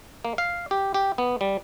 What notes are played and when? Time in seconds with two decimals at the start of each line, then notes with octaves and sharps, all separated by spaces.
0.25 A#3
0.38 F5
0.71 G4
0.94 G4
1.18 B3
1.41 G3